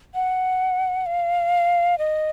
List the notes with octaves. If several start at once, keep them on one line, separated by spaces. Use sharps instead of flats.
F#5
F5
D#5